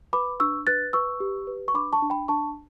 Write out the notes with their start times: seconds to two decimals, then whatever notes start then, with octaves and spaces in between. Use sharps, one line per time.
0.13 B4 B5 D6
0.40 D4 C#6 E6
0.67 B4 F#6 A6
0.93 B4 C#6 E6
1.20 G4
1.47 B4
1.68 C#6
1.74 D4 B5 D6
1.93 A5 C#6
2.02 D4
2.10 G5 B5
2.28 D4 A5 C#6